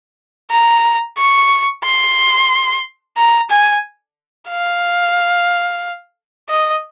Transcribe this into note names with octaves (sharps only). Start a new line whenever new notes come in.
A#5
C#6
C6
A#5
G#5
F5
D#5